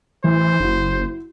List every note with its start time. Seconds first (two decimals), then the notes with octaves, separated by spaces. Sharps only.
0.24 A1 E3 C5
0.60 F#1 E4 F#4